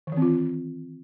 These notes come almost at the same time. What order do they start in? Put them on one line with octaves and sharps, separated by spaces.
D#3 E3 C4 F4